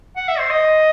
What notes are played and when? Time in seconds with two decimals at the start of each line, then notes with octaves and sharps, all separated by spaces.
0.16 F#5
0.28 E5
0.39 C5
0.50 D#5